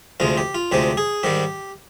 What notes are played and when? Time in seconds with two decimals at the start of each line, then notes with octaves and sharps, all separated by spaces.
0.20 D2 C3 F3 G#3 F4
0.37 G4
0.55 F4
0.72 D2 C3 F3 G#3 G4
0.97 G#4
1.23 G#2 D#3 G3 G4